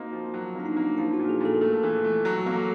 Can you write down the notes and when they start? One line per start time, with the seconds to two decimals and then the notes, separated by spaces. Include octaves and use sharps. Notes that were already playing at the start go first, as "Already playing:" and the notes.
Already playing: A#3 C4 D#4 F#4
0.13 F3
0.34 F#3
0.55 A#3 D4
0.66 D#4
0.76 A#3
0.97 F3 E4
1.14 F#4
1.19 A#2
1.29 G#4
1.40 A#2 A4
1.54 A#4
1.61 A3 A4
1.83 E3
2.04 A3
2.25 F#3
2.46 A#3